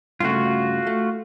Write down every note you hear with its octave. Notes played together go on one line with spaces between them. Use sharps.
G2 C#3 A3 F4 F#4
A3